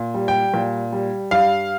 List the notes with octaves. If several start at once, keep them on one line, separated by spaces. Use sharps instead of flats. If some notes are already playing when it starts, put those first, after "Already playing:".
Already playing: A#2
G3
G5
A#2
G3
G2 F5